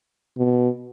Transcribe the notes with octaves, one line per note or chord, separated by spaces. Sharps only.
B2